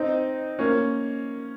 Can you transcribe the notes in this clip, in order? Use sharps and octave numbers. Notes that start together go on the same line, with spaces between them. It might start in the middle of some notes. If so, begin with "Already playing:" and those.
Already playing: C4 D#4
A#3 C#4